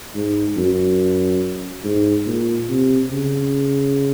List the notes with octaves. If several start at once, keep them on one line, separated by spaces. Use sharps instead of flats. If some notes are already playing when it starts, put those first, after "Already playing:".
G#2
F#2
G#2
A#2
C3
C#3